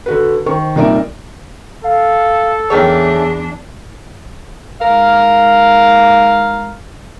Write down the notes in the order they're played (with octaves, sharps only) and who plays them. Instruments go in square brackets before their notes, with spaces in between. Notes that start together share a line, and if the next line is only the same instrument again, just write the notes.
[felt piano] D3 F#4 B4
D#3 C5 C#6
C2 A#2 D#4 A#4 D5 E5
[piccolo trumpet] A4 [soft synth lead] F5
[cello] E2 D4 [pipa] D#3 A3 C#5 [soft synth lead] G#4
[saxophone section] G#2 A#4 F5